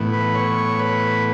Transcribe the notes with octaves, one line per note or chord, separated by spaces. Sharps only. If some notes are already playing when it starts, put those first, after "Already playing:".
Already playing: A2 E3 B3
B4
C#5
B4